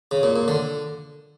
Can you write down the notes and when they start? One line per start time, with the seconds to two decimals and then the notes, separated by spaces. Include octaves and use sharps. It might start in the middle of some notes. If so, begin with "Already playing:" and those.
0.11 C#3
0.23 A#2
0.36 A#2
0.48 D3